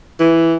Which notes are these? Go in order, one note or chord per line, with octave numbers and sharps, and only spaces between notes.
E3